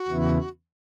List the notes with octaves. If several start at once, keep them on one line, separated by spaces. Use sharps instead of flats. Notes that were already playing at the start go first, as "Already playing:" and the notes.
Already playing: F#4
E2 C#3 E3 B3 E4